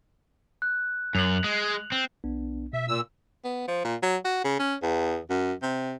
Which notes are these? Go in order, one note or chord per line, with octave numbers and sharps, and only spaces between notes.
F#6
F#2 F7 F#7
G#3
C4
B1 B3 D4
B2 E5
A#2 E6
B3
F3
A#2
F#3
F#4
C#3
C#4
E2
F#2
C3